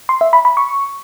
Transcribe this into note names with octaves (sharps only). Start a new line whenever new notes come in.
C6
E5
B5
B5
C#6